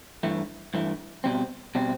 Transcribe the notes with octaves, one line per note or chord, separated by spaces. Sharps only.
G2 E3 A3
G2 E3 A3
B2 G3 C4
B2 G3 C4